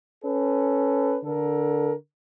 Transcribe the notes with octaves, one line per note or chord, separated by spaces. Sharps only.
C#4 A4 B4
D3 A4 A#4